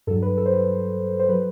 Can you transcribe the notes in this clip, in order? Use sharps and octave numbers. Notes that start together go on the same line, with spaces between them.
G2 F#3 A4
B4
A4
C5
B4
C5
F#3 B4